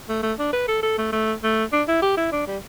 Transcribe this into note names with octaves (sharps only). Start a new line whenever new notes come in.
A3
A3
D4
B4
A4
A4
A3
A3
A3
D4
E4
G4
E4
D4
G3